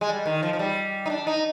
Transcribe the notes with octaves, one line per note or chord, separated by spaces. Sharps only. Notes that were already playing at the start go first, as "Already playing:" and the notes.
G#3
G3
D#3
F3
F3
G3
D#4
D4
D#4